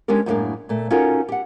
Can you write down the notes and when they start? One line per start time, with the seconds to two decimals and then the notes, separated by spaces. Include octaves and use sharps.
0.08 G#3 C#4 D4 G4 A#4
0.26 F#2 A2 G3 G#3 A#3 D4
0.69 A#2 A3
0.91 C#4 D#4 F4 F#4 A4 A#4
1.29 G4 F#5